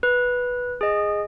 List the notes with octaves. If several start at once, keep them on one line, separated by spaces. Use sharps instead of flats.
B4
G#4 D#5